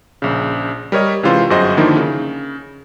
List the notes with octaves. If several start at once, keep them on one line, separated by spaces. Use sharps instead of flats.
A#1 C#3
G3 A#4 C#5 D#5
C3 E3 G#3 C#4 F4 C5
G1 F#2 F#4 G#4 C5 D#5
D3 D#3 F3 A#3 D#4 E4
C#3